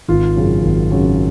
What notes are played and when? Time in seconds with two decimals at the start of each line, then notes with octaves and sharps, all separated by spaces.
0.08 G#1 F4
0.36 F#2 C#3 F#3
0.63 G#1
0.91 F#2 C#3 F#3